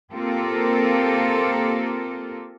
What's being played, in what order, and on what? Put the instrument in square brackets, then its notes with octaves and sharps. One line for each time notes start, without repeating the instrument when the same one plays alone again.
[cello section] A#3 C4 F4 G4 A4 A#4